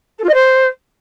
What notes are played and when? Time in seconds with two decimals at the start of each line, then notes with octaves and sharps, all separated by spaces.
0.18 A4
0.23 F4
0.28 D#5
0.34 C5